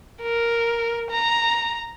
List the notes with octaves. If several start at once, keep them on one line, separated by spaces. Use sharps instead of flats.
A#4
A#5